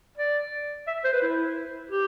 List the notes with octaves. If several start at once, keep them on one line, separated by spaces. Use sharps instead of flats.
D5
E5
C5
B4
E4
G4